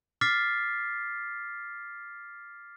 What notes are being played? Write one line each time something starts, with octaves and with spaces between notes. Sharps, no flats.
D6 F6 A6 B6 C7